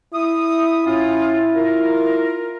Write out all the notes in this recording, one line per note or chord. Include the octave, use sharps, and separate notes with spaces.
E4 E5 D#6
A2 C#4 F4
F4 A#4